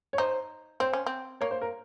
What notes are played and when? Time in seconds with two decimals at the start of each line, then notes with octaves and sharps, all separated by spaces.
0.13 C#5
0.18 D#4 C5
0.80 C4 C5
0.93 C#4
1.06 C4
1.41 A#3 C#5
1.51 C5
1.61 A#4